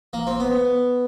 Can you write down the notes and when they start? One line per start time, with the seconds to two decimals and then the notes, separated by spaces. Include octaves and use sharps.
0.13 A#3
0.27 C4
0.40 B3